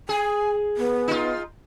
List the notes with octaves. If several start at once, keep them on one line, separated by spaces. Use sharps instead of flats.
G#4 G#5
B3
D#4 F4